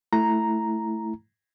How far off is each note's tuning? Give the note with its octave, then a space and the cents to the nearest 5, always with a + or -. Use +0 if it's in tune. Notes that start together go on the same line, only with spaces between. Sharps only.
A3 +0 E4 +0 A#5 +0